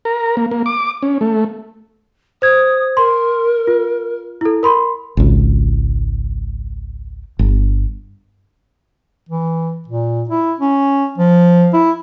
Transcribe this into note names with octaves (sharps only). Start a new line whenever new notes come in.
A#4
A#3
A#3
D6
C#4
A3
C5 D#6 G#6
A#4 C6
F4
E4 A4
A#4 B5 C6
G#1 C#2
G1
E3
A#2
E4
C#4
F3
E4